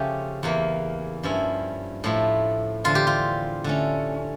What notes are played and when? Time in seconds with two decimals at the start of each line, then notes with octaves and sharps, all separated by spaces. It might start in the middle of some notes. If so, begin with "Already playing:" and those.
Already playing: C#3 F3 A3 C#4 F4 G4
0.43 E2 E3 A#3
1.23 G2 F3 C#4 E4
2.04 A2 F3 A3 E4
2.84 E2 D3 F3 F4
2.95 G4
3.07 F4
3.64 D3 A3 C#4